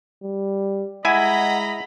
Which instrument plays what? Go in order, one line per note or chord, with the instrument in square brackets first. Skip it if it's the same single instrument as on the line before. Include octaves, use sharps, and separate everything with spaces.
[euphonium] G3
[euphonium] G#3 [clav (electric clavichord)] E4 G#5 [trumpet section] D#5 A#5 B5 [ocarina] F#5